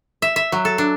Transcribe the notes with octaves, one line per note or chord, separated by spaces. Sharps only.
E5
E5
F#3
A4
D4